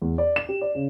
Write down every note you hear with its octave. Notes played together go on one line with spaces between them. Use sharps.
E2
D5
E7
G4
D5
C#3